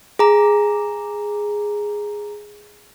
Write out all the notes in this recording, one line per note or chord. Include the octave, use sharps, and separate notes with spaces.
G#4 A#5